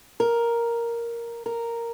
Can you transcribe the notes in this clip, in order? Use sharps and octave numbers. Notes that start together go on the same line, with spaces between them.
A#4
A#4